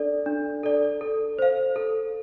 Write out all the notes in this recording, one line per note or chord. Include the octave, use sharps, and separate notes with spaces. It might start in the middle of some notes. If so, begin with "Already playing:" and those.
Already playing: D4 A4 D5
D4
A4 D5
A4
C5 F5
A4